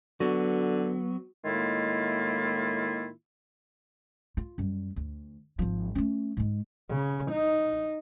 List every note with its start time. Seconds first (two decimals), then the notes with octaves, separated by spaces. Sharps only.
0.20 D3 F#3 B3 F#4
1.44 A2 D#3 G#3 A#3 E4 F4
4.37 F4
4.58 F#2 G3
4.96 D2
5.59 G#1 F3
5.95 A3 C#4
6.37 G#2 G#3
6.89 C#3
7.32 D#4